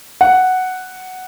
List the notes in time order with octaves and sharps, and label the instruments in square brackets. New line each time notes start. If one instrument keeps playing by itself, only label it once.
[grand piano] F#5